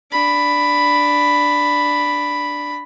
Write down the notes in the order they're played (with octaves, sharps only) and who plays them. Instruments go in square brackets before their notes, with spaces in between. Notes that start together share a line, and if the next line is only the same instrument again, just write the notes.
[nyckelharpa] D4 B5